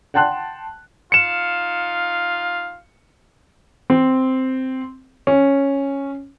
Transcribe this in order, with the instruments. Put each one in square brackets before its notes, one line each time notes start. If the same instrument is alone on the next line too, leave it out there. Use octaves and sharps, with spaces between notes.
[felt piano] F#5 G5 A5 C6 F#6
[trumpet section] D#4 F4 F5 [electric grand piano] C#7 E7
[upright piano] C4
C#4